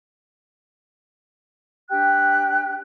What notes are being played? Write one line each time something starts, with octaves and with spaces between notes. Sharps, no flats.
D4 G4 G5 F#6